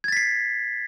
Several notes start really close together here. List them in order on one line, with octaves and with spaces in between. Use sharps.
G#6 A6 B6 C7